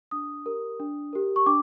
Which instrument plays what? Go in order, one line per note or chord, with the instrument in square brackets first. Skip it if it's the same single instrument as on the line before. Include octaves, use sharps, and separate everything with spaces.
[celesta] D4 D#6
G4 A#4
D4
G4 A#4
C#6
D4 D6